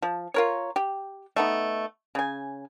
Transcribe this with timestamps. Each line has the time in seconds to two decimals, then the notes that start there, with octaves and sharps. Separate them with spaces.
0.02 F3
0.34 F4 A#4 C#5
0.76 G4
1.36 A3 B3 D#4
2.15 C#3 G#5